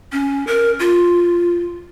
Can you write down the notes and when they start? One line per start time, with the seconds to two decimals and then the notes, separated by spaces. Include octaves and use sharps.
0.12 C#4
0.47 A#4
0.80 F4